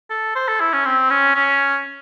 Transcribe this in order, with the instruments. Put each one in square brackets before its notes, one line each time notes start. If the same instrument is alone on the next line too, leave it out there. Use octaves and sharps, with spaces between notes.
[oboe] A4
C5
A4
E4
C#4
C4
C#4
C#4